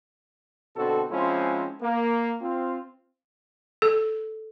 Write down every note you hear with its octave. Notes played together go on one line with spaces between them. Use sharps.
B2 D3 C4 F#4 A4
F3 G#3 C4 C#4 E4 F4
A#3
C4 F4
A4